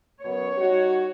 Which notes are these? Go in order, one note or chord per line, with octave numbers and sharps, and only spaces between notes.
F#2 B2 C#5
G3 D#4 F#4